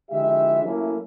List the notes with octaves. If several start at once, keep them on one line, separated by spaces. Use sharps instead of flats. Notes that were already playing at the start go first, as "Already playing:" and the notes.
D3 F3 G#3 E4 G4 E5
F#3 A3 A#3 C#4 E4